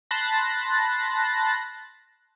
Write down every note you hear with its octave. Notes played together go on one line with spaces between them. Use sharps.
A5 B5 C6 F#6 A6 A#6